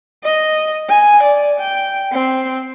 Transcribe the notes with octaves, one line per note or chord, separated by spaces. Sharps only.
D#5
G#5
D5
G5
C4